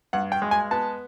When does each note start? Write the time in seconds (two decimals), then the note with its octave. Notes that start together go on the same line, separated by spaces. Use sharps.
0.13 G2 F#5
0.32 G5
0.42 G#3
0.51 G#5
0.71 B3 A5